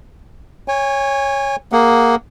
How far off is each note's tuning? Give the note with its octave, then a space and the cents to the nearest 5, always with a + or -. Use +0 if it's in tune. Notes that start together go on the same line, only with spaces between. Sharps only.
C#5 +0 G#5 -30
A#3 +0 G#4 -10 F#5 +0